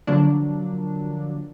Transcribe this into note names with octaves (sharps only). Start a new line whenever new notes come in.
D3 F3 F#3 A#3 D4